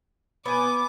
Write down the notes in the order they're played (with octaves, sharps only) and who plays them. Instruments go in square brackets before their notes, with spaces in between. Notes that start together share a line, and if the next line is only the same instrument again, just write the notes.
[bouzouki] B3 G#5 [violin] D6